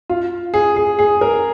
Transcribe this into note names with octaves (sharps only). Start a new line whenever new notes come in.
F4
G#4
G#4
G#4
A#4